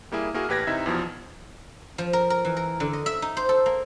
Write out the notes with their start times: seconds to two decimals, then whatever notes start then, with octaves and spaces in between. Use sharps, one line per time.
0.12 G3 A#3 E4 G#4
0.34 A#3 E4 F#4 G#4 A#4
0.49 A1 G4 B4 G#6 A#6
0.67 C3 D#4 E4 E5
0.86 E2 B2 F3
1.98 F3
2.13 A#4
2.30 A#4
2.45 E3
2.57 A#4
2.80 D3
2.93 D#5
3.06 E5
3.22 D#4
3.37 C5
3.49 A4
3.66 A#3